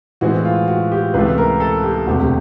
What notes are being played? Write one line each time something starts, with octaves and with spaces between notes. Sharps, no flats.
A2 E3 G#3 C4 F#4
F4
F#4
G4
C#2 C3 E3 A3 B4
A#4
A4
G4
E1 D2 C3 F#4
G4